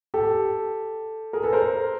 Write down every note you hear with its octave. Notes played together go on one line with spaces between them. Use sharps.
G4 A4
G#4 A#4
A4 B4
A#4 C5